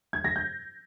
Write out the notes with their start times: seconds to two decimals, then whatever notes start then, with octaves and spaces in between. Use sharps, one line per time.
0.13 G#6
0.24 A#6
0.36 G6